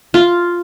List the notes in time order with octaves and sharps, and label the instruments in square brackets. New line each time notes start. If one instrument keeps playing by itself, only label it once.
[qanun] F4